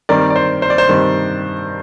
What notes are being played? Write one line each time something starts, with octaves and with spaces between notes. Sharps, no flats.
G2 D#3 G3 C4 A#4 D5
D5
C5
C5
D5
C5
G2 D#3 G3 C4